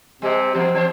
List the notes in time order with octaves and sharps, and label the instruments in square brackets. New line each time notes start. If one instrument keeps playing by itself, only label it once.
[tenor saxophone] C3 [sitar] G3
[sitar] E2 [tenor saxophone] C4
[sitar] E3 C5